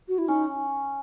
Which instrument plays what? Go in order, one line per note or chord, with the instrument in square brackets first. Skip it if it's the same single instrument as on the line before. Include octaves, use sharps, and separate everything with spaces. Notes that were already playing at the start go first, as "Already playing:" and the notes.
[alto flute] F#4
E4
[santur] C#4 [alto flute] D#4